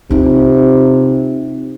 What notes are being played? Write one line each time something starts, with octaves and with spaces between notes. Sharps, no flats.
C3 D#4 F4